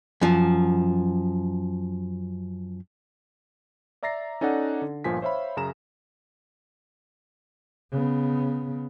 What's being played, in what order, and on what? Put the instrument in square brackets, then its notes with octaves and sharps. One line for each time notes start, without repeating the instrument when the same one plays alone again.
[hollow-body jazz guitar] F#2 F3
[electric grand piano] D5 E5 A#5 A6 A#6 C7
C#4 D#4 A4 D5 F#5
D3
G1 A#2 F3 G#5 B6
C5 C#5 E5 F5 B5
F#2 C#3 A#5 E7
[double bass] C#3 B3